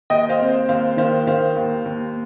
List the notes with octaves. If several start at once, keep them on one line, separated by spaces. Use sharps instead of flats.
D#2 D#5 G5
C5 F5
C4
C5
D#2 C5 F5
D#3 C5 F5
D#3 C5 F5
D#2
D#2